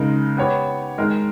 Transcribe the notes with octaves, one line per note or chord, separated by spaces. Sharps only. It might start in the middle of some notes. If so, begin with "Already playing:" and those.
Already playing: C#3 G#3 D#4 A#4
B3 G4 C#5
D#3 G#3 D#4 A#4